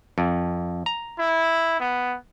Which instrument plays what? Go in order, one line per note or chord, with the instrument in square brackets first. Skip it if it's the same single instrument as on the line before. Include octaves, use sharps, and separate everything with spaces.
[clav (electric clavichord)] F2
A#5
[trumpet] E4
B3